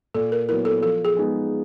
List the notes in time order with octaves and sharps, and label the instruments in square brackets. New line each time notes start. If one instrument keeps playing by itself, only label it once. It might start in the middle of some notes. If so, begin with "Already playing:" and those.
[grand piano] A#2 [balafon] A4
[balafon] A#4
[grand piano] F#3 B3 E4 [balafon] A#4
[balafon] A4
[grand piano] F3 [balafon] A4
[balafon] G#4
[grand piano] G#3 B3 D#4 G#4